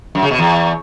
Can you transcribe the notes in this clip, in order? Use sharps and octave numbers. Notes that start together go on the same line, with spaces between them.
F#2
C#3
B2
E2